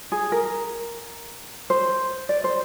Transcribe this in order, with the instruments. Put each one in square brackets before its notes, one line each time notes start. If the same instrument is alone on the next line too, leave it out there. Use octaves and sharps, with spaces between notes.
[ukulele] G#4
A#4
C5
D5
C5